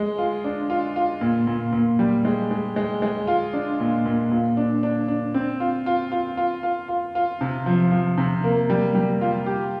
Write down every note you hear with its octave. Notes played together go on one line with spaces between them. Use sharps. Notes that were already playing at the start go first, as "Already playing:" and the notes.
Already playing: G#3
F4
D4
F4
F4
A#2
A#2
A#2
G3
G#3
G#3
G#3
G#3
F4
D4
A#2
A#2
A#2
D4
D4
D4
C4
F4
F4
F4
F4
F4
F4
F4
C3
F3
F3
C3
A#3
G3
G3
F4
G4